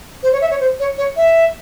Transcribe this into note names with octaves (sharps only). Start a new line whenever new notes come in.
C5
C#5
E5
C#5
C5
C#5
C#5
E5